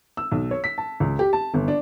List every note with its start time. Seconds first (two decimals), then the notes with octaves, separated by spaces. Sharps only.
0.17 E6
0.32 B1
0.51 C#5
0.64 B6
0.78 A5
1.00 C#2
1.19 G4
1.33 A5
1.54 G1
1.68 D4